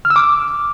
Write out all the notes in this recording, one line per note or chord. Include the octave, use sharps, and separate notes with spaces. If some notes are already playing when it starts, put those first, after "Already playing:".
F6
E6
D6